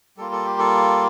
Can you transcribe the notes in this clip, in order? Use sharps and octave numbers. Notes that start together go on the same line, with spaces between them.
G3 A#3 F4 A4
A4
G4
A4